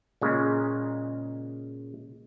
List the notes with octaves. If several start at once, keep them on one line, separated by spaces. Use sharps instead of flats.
A#2 C#3 G#3